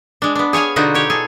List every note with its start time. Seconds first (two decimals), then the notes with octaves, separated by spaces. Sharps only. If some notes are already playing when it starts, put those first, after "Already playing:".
0.22 G#3 D4
0.35 B3 D4
0.53 G#4 C#5 F5 G#5
0.76 B2 D3 D#4 F4 F#4
0.94 G4 C#5
1.10 G#4 A4 G#5